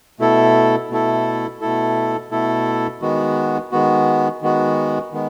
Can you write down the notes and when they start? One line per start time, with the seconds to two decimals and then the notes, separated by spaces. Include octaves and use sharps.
0.20 B2 A3 E4 A4
0.90 B2 A3 E4 A4
1.61 B2 A3 E4 A4
2.31 B2 A3 E4 A4
3.02 D#3 G#3 B3 F#4
3.72 D#3 G#3 B3 F#4
4.42 D#3 G#3 B3 F#4
5.13 D#3 G#3 B3